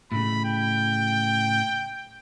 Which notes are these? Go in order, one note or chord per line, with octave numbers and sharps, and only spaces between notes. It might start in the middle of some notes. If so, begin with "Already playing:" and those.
A2 C#3 B5
G5